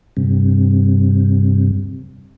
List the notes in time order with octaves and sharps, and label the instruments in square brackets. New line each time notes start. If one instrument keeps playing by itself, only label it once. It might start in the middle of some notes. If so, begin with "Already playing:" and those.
[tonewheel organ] G2 C3